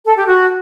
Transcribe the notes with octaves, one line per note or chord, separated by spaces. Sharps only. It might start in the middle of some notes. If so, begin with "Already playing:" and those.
A4
G4
F#4